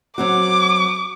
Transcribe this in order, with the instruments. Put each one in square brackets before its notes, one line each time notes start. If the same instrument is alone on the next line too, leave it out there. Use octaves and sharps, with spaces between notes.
[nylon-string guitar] F#3 C4 F#4 [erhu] D6